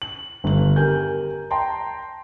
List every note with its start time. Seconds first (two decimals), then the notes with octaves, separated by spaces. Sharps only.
0.02 F#7
0.44 G1 F#7
0.76 G4 A#4 G#5 G6
1.51 G5 A5 A#5 C6